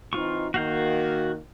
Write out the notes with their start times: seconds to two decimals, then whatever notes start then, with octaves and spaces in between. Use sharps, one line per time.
0.13 E3 C4 D#4 F4 C#6
0.54 D#3 A#3 F#4 F5 G6